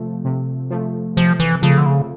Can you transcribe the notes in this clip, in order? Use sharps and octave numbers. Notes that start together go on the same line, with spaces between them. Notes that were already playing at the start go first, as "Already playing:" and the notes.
Already playing: C3 F3 A3
C3
F3 A3
C3 F3
E3
C#3 F3 A3
D3
C#3